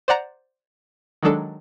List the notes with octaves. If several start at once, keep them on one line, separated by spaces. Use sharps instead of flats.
C5 D5 F#5 A#5
D#3 F#3 G#3 D4 A4